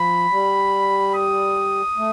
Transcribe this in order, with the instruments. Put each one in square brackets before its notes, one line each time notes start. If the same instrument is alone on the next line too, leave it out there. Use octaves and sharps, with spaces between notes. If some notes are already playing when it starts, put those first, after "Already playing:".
Already playing: [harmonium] F3 [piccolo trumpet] B5
[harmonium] G3
[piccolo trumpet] D#6
[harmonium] A3